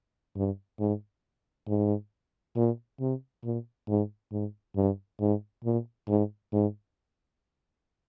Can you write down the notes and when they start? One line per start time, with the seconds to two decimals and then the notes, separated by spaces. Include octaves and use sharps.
0.36 G2
0.79 G#2
1.67 G#2
2.56 A#2
3.00 C3
3.44 A#2
3.88 G#2
4.32 G#2
4.76 G2
5.20 G#2
5.64 A#2
6.08 G#2
6.52 G#2